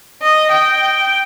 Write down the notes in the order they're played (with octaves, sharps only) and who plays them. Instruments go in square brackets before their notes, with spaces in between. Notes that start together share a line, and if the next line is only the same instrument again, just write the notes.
[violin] D#5
G5